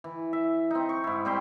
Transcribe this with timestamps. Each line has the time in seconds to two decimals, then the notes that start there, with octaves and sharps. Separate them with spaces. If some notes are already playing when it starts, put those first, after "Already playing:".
0.04 E3
0.33 E5
0.71 C4 D#4
0.89 C#6
1.04 G#2 E4
1.25 G3 C4 G4 C6